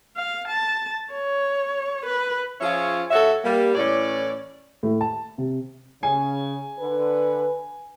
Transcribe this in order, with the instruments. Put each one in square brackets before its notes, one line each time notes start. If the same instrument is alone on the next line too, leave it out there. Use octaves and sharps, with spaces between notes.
[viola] F5
A5
C#5
B4
[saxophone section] F3 C#4 F4 G#4 C#5 E5
D2 F#4 A4 C#5 E5
G3 A#3
A2 E3 C#4 C#5 D5
[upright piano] A2
A5
C3
[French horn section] C#3 [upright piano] G#5
[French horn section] D3 B4